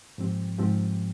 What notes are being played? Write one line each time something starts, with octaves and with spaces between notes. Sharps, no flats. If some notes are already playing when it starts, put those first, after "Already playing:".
G#2 F3 C4 G4
G#2 F3 C4 G4